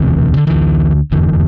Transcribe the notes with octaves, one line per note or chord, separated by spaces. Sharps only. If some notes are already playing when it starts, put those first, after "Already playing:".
Already playing: E1 D2 C3 E3
D3
D2 D3 E3
F1 E2 D3 E3